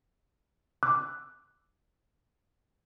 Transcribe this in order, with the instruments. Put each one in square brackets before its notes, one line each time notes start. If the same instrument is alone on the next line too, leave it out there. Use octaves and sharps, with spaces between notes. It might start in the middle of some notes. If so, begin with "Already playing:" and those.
[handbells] D6 E6 F#6